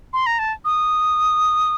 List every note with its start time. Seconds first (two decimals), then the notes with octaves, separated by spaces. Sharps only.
0.13 C6
0.26 A#5
0.39 A5
0.65 D#6